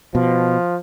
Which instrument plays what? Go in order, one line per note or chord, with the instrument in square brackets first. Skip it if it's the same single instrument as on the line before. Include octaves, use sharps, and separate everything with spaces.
[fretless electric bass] B2 [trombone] F3